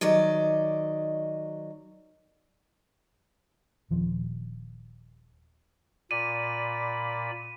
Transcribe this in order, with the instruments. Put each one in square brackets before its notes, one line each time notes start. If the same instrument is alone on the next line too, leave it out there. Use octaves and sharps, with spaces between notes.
[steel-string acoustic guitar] D#3 F#3 D5 D#5
[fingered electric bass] D#1 F3
[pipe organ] A#2 D5 B5 [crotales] D#7